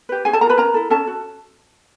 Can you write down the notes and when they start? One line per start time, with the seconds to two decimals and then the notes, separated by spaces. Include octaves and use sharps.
0.09 G4 B4
0.25 C#4 G#4 G#5
0.33 A4 A5
0.41 G#4 A#4 A#5
0.46 F4 B4 B5
0.58 C#4 A#4 A#5
0.74 E4 A4
0.90 C#4 A4 A5
1.07 F#4